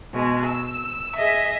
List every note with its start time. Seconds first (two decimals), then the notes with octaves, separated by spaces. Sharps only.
0.14 B2 G#3
0.45 E6
1.16 G#4 D#5 E5